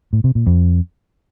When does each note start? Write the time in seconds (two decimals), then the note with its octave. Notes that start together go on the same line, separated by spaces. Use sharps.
0.13 A2
0.24 C3
0.35 A#2
0.47 F2